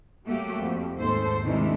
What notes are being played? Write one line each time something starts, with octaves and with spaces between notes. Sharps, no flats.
F#3 A3 A#3 F#4 G4
F2
D#2 G#2 A4 C5
C3 D#3 E3 G#3 A3 D4